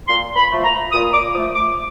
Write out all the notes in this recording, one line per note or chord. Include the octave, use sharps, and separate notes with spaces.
A#2 C6
B5
F3 A3
A#5
A#2 D#6
D6
F3 A3 D#6
D6